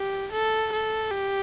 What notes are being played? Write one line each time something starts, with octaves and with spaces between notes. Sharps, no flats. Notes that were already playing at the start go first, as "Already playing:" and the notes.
Already playing: G4
A4
A4
G4